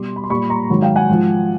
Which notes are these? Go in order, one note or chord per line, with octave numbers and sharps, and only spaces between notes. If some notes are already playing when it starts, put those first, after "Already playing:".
Already playing: B2 G3 C6 D6
B5
C6
A#2 G3 B5 C#6
A#5 C6
G#2 D#3 F#3
F5 G5
F#5 G#5
G#2 F3